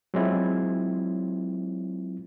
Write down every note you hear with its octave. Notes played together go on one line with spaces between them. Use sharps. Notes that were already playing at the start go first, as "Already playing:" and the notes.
F#3 G#3 C4 E4 F4